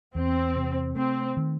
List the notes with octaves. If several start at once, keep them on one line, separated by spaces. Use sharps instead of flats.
E2 C4
C3
A3 C4
D#3